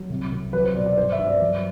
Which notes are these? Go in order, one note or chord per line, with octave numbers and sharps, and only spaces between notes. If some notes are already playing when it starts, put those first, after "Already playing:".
Already playing: F#3
C2
C2
F#3 B4
C5
B2 D5
D5
G2 C5
E5
G2
D5
F#3